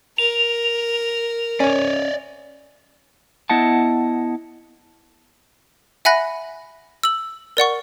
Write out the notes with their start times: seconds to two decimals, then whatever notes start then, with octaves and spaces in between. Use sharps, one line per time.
0.18 A#4 F7
1.60 C#4 C#5 D5
3.50 B3 E4 D#5 F#5 A5
6.05 E5 F#5 G#5 B5 F#6 A#6
7.04 E6 F#7
7.57 A#4 D5 F#5 C#6